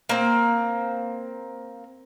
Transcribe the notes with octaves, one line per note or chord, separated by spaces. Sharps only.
A#3 C4